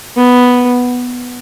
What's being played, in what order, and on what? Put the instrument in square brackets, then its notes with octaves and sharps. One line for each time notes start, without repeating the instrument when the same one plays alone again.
[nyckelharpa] B3